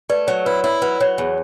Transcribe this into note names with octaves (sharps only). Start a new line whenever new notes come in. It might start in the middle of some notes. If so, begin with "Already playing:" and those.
A3 B4 D5
F#3 C#5
E4 B4
E4 C#5
F#3 B4
F#3 C#5
E2